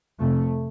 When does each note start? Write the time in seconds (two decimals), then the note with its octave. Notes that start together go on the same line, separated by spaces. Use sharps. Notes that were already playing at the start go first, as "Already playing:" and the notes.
0.19 F2 C3 A3